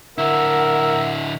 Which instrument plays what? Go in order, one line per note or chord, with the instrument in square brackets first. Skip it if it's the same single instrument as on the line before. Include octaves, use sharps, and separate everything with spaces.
[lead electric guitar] D3 E4 [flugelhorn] A#4 [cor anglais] E5 [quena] F#5